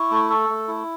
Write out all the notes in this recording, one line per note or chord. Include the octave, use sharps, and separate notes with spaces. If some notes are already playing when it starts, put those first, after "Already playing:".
Already playing: E4 C#6
A3
A4
A3
E4